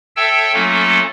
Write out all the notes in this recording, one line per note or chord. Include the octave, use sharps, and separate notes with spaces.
A4 C#5 E5 G5 A5 E6
F#3 A3 A#3 C#4 F4 A4